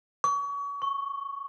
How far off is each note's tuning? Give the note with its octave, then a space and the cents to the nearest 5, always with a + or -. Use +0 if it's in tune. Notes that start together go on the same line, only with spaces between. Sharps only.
C#6 +35
C#6 -5